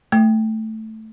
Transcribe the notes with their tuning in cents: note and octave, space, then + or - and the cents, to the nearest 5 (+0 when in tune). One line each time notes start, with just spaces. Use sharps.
A3 +0